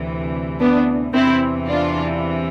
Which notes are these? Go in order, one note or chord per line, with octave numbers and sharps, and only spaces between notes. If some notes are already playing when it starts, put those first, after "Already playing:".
Already playing: D2 C3 E3
B3 D4
E2 C3 E3 C4 E4
D4 F4